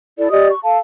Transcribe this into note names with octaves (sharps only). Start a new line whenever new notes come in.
E4 A4 D5
G4 D5 D#5 D#6
C#6
A4 F5 A5